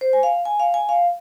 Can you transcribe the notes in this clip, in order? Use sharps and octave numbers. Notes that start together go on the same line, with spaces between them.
C5
G#5
F5
G#5
F5
G#5
F5